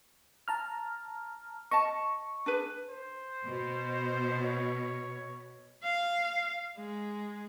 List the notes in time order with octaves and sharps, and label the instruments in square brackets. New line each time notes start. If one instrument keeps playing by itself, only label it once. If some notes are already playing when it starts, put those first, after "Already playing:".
[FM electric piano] A5 A#5 F6
[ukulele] D#5 A5 [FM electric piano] C#6
[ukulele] D4 G#4 B4
[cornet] C5
[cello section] B2
[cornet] C#5
[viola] F5
G#3